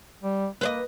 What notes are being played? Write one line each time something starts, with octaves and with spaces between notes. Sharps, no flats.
G3
A#3 B4 C5 D#5